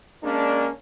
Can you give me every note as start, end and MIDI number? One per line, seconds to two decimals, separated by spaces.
0.23 0.69 56
0.23 0.69 58
0.23 0.69 61
0.23 0.69 62